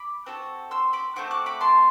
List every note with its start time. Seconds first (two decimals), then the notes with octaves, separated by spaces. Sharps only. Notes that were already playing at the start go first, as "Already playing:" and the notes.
Already playing: B5 D6
0.26 C4 F#4 A4
0.71 C6 E6
0.93 B5 D6
1.16 A3 C4 F#4 D6
1.31 D6 F#6
1.46 B5 D6
1.61 A5 C6